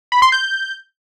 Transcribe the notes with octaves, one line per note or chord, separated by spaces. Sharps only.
B5
C6
G6